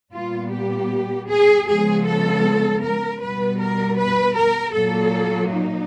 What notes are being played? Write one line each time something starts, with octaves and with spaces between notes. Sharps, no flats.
A#2 G3 B3 F4
G4
G#4
C#3 F3 G#3 B3 G#4
A4
A#4
B2 G3 B3 B4
A#4
B4
A#4
A#2 F#3 A#3 A4
D#4